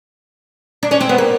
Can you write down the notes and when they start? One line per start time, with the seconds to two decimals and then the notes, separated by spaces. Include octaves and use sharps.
0.83 D4
0.91 C#4
1.01 C4
1.09 B3
1.18 A#3